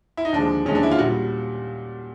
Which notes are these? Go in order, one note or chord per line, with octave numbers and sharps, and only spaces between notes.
E4
D#4
D#2 D3 F3 G#3 D4
D#2 D3 F3 G#3 C#4
D4
E4
F4
A#2 G3 F#4